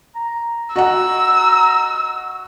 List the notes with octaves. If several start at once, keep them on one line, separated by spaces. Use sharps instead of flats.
A#5
F#4 D#5 F#5 A#5 E6